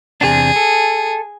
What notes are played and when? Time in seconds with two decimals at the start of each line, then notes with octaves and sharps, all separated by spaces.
0.21 E2 C3 D4 G#4
0.56 A4